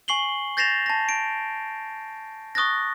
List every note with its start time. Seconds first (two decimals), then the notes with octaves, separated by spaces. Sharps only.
0.08 G#5 C#6 C7 F#7 G7
0.57 G6 A6 A#6 C7 E7 F7
0.86 A5 A#6
1.09 D7
2.55 C#6 D#6 F#6 A6 A#6